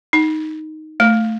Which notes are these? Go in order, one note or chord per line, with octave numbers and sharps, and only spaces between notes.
D#4
A3